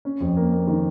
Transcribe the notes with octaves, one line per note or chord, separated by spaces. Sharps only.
C#4
F2
A#3
A#3
D#3